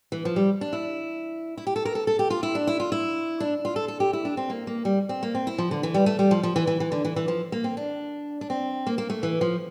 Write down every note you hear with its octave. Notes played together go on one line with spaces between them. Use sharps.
E3
F3
G3
D4
E4
E4
G4
A4
A#4
A4
A4
G4
F4
E4
D4
E4
F4
E4
D4
F4
A4
A4
G4
E4
D4
C4
A#3
A#3
G3
C4
A#3
C4
E4
F3
D3
E3
G3
A3
G3
F3
F3
E3
E3
E3
D3
E3
E3
F3
A#3
C4
D4
D4
C4
A#3
A#3
A3
E3
F3